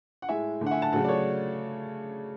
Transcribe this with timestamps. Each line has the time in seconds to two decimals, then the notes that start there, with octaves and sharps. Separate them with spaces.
0.22 F#5
0.29 A2 G#3 E5 G#5
0.61 D3 A3
0.66 F#5
0.71 E5 G#5
0.82 F#5 A5
0.93 C#3 F#3 A3 F#5 A5
1.04 D5
1.09 A4 C#5